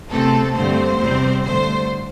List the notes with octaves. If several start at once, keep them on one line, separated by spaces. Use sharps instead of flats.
E2 C3 A3 C4 A4
G2 D3 A3 C4 C5
E2 C3 G3 C4
G2 D3 A3 C5